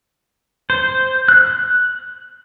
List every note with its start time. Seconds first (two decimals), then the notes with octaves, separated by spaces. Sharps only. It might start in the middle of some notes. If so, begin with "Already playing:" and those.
0.70 C5
1.28 F#6